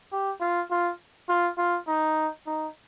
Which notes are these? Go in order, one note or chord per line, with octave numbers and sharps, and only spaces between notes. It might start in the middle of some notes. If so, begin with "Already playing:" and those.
G4
F4
F4
F4
F4
D#4
D#4